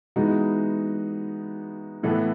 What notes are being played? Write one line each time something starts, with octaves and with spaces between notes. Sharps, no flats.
E3 G#3 B3 D#4 F#4
A2 E3 B3 E4 A4